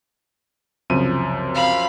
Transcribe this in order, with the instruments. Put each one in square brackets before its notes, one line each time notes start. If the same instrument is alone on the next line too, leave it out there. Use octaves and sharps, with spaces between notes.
[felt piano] C#2 C3 [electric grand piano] F#2 F3 D#7
[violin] F5 B5